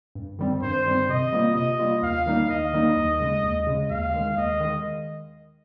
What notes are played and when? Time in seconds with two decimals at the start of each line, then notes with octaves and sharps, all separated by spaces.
0.15 G2
0.39 D#3 G3 C4
0.62 G2 C5
0.86 D#3 G3 C4
1.09 C3 D#5
1.33 G3 A#3 F4
1.55 C3 D#5
1.80 G3 A#3 F4
2.03 D#2 F5
2.26 D#3 G3 A#3 D#4
2.50 D#2 D#5
2.73 D#3 G3 A#3 D#4
2.96 D#2
3.20 C#3 G#3
3.43 D#2
3.67 C#3 G#3
3.90 D#2 F5
4.14 D#3 G#3
4.37 D#2 D#5
4.60 D#3 G#3